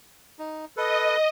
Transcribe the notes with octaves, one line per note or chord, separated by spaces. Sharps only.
D#4
A4 B4 D#5